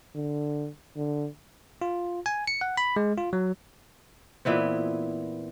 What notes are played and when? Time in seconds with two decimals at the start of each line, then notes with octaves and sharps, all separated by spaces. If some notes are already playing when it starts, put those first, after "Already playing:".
0.15 D3
0.96 D3
1.82 F4
2.26 G#5
2.47 C#7
2.61 F#5
2.77 B5
2.96 G#3
3.18 F4
3.33 F#3
4.45 A#2 E3 B3 C4